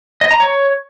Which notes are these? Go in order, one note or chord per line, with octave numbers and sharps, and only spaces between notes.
D#5
A#5
C#5